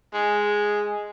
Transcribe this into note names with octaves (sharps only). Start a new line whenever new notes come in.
G#3